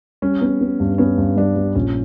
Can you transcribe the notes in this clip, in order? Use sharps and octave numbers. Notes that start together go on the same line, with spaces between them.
G3 C#4
B3
B3
G2
B3 C#4
G2
G3 D4
G3
A#1 C#4